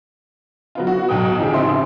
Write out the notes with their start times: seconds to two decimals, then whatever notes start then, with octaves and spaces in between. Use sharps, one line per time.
0.75 F#3 B3 F4
0.87 F#4
1.09 B1 F#3 G5 D#6
1.38 D3 E3 F3 D#4 G4 G#4
1.51 A1 C#3 F3 C4 E5 C6